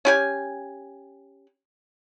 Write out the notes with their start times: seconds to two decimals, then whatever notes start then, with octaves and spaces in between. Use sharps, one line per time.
0.05 C#4 G4 G#5